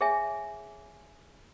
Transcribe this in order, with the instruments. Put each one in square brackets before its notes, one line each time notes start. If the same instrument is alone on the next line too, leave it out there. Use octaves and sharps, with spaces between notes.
[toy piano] G#4 C#5 E5 G#5